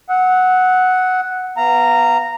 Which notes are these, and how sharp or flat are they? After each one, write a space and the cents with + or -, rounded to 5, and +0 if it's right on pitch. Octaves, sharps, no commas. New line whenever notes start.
F#5 +0 E6 -40
B3 +0 F5 -25 A#5 -10